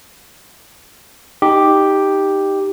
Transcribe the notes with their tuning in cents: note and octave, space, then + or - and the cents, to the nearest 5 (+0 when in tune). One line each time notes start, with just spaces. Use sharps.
D#4 +0 G4 +0